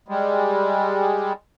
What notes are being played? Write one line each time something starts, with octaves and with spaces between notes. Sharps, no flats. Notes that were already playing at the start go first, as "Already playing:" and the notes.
G3 G#3